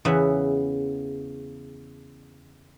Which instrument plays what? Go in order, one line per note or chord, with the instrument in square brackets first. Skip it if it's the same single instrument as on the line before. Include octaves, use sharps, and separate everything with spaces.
[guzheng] E2 C#3 B3 E5